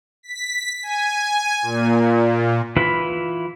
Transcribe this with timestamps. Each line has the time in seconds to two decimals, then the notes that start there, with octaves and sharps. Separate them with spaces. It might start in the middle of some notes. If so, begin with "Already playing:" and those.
0.23 B6
0.83 G#5
1.62 A#2
2.77 E3 E4 F4 B4 B5